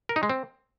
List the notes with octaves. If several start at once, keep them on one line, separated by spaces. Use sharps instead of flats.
A#4
D#4
G#3
C4